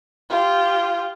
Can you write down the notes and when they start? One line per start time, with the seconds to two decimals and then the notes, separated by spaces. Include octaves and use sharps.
0.29 F4 G4